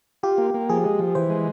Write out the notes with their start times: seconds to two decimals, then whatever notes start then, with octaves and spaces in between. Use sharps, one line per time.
0.23 F4 G4
0.38 A#3
0.54 A#3
0.69 F3 G#4
0.84 G#3
0.99 F3
1.15 E3 C5
1.30 G#3